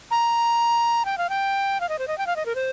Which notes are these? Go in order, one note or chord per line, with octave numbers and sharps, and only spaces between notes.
A#5
G5
F5
G5
F5
D#5
C5
D#5
G5
F5
D#5
A#4
C5